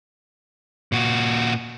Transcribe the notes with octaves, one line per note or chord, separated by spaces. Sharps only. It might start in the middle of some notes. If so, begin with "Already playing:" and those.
A#2 F#4